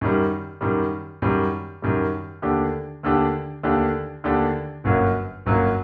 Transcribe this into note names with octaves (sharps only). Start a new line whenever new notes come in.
F#2 D#3 G3
F#2 D#3 G3
F#2 D#3 G3
F#2 D#3 G3
D#2 D3 A3 D4 G4
D#2 D3 A3 D4 G4
D#2 D3 A3 D4 G4
D#2 D3 A3 D4 G4
G1 F#2 F#3 A#3
G1 F#2 F#3 A#3